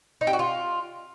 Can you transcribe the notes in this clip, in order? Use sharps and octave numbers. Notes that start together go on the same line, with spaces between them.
D#4
G4
F#4
F4